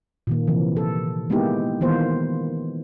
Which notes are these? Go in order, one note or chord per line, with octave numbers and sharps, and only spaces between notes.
A#2 D#3 A#3
C3 E3 F3
A4
G#3 A#3 B3 D#4 E4 G4
D#3 E3 A#3 B3 F4 C5